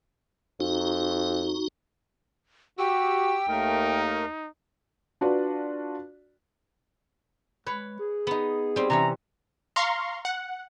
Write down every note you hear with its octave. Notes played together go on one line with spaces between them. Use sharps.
F2 D#4 F#4
F#4 G4 G5 E6
D#2 A3 D#4 A#4
D4 F4 F#4 B4 D5
G#3 B4 C#5
G#4
B3 D#4
G3 C4
C3 E3 C#4 A#5
F5 A#5 C6 C#6
F#5